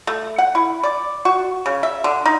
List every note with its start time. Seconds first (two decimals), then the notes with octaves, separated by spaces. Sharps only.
0.07 A3
0.38 F#5
0.55 E4
0.83 D5
1.25 F#4
1.66 C#3
1.83 E5
2.04 D3
2.25 D#4